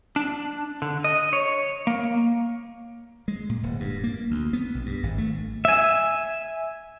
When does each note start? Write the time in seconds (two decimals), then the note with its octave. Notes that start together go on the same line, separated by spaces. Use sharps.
0.16 D4
0.82 D3
1.04 D#5
1.33 C#5
1.87 A#3
3.28 G#3
3.49 A#2
3.63 D1
3.80 G2
4.04 A#3
4.31 D2
4.53 B3
4.74 B1
4.86 G2
5.03 G#1
5.18 A3
5.65 E5 G#5